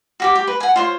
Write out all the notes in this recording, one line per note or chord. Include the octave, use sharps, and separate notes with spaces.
F#4 G4 D6
G4
B4
F#5 G#5
F4 C5 C#5